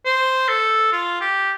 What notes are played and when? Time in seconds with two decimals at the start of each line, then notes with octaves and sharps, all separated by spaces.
0.05 C5
0.49 A4
0.92 F4
1.21 G4